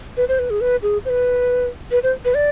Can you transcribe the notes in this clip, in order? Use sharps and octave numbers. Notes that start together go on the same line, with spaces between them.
B4
C5
B4
G#4
B4
G#4
C5
B4
B4
C5
B4
D5